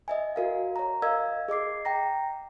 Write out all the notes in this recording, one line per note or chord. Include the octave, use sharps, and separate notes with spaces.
D#5 E5 G#5
F#4 A#4 F5
C#5 A#5
A#4 D#5 F5 E6 G#6
G#4 D#5 D6 C7
G5 A#5 A#6